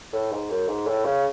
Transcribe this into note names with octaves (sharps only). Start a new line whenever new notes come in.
A2
G#2
F#2
G#2
A2
C#3